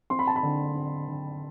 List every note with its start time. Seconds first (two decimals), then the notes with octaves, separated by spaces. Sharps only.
0.10 C4 C6
0.19 B5
0.27 A5
0.36 B5
0.43 D3
0.75 C4
1.07 D3